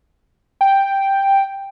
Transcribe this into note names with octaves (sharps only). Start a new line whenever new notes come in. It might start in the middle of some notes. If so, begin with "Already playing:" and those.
G5